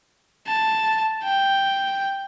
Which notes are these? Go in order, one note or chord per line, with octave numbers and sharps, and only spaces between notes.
A5
G5